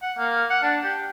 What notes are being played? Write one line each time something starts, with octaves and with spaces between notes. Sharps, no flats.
F#5
A#3
F#5
D4
G4